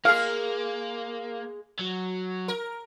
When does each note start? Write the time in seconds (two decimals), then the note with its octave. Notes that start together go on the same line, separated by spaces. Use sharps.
0.05 G#3 A#3 G#4 F5
1.79 F#3
2.48 A#4